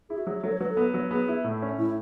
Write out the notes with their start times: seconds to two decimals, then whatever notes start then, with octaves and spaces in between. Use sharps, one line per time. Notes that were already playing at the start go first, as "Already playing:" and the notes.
0.09 E4 G#4
0.18 F#4
0.27 F#3 G#4
0.43 F#3 A4
0.52 C#5
0.60 F#3 B4
0.70 A4
0.77 B3
0.94 F#3
1.11 B3 G#4
1.28 E4
1.44 A2
1.62 C#4
1.79 A2 E4